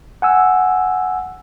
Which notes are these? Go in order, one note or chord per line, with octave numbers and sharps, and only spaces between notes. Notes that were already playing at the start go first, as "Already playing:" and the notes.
F#5 G#5 E6